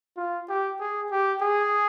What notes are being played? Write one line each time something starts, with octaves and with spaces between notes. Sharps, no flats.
F4
G4
G#4
G4
G#4